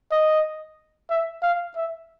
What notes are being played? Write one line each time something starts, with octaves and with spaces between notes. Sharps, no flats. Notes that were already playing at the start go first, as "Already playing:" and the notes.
D#5
E5
F5
E5